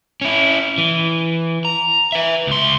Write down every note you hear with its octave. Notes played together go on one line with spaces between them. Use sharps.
C#4 E4
E3
A#5
B4 E5
C#2 C6